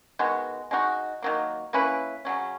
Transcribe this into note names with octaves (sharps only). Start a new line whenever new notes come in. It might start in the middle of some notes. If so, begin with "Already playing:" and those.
D#3 G#3 B3 F#4
G#3 D#4 F#4
D#3 F#3 A#3
A#3 C#4 E4 B4
C#3 F#3 C#4